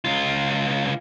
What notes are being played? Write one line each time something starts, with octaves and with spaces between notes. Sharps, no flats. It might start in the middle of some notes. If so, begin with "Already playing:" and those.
C#2 F4